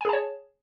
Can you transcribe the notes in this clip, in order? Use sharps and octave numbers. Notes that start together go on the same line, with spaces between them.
G#4 C#5 G#5 A5